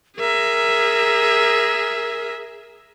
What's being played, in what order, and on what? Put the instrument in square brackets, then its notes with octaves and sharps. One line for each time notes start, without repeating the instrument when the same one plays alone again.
[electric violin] G#4 E5 [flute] A#4